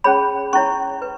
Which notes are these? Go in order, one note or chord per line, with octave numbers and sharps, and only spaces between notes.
C#4 G#4 C#5 B5
C#4 E4 C#5 C#6
B4